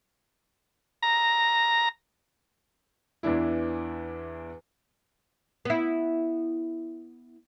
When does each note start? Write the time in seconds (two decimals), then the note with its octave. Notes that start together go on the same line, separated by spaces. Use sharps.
1.03 A#5
3.23 E2 E3 D4 E4
5.65 B3 E4